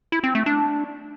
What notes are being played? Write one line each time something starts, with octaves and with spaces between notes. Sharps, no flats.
E4
C4
A3
D4